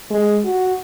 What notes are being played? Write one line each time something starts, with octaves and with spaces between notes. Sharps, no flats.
G#3
F#4